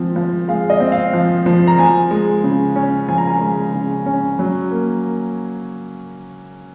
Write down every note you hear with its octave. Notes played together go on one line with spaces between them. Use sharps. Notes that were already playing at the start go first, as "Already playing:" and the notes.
Already playing: F3 G#3 C4
F3
G#3 F5
D#5
C4
F5
F3
F3
A#5
F3 G#5
G#3
C#3
C#4
F3 G#5
A#5
G#5
G#3
C#3
C#4
F#3
A#3